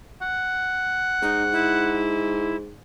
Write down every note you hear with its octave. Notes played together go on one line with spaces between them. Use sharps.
F#5
G#2 D#4
E4